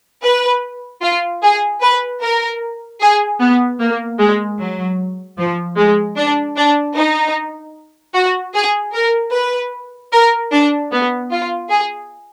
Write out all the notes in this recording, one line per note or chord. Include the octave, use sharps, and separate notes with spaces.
B4
F4
G#4
B4
A#4
G#4
B3
A#3
G#3
F#3
F3
G#3
D4
D4
D#4
F#4
G#4
A#4
B4
A#4
D4
B3
F4
G#4